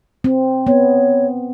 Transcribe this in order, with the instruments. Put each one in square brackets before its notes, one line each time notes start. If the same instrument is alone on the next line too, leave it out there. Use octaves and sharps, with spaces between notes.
[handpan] C4
[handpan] B3 [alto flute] C#5